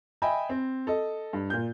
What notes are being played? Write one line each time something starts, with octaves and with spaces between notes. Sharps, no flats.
D#5 E5 G5 G#5 B5
C4
A4 D#5
G2
A#2 G6